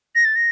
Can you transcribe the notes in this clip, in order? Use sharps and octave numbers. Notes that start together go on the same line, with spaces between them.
A#6
A6
A#6